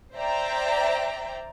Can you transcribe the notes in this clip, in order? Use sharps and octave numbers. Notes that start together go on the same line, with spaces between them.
C5 D5 E5 G5 A#5